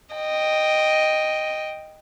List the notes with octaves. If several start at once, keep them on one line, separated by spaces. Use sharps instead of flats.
D#5 G5